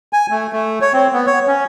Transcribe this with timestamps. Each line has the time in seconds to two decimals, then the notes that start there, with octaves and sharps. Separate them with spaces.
0.13 G#5
0.30 A3
0.53 A3
0.81 C#5
0.93 C4
1.13 B3
1.27 C#5
1.47 C#4